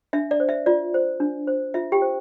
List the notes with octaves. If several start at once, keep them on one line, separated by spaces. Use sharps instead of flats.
D4 E5
D5
C5
E5
F4 D5
C5
D4
C5
F4 E5
G4 G5
C5